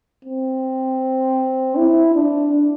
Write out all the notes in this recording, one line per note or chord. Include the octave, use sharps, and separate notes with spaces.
C4
E4
D4